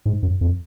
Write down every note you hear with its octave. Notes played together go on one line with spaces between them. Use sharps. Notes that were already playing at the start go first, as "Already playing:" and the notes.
G#2
F#2
F2